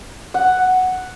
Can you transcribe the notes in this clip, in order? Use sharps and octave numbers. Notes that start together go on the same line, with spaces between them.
F#5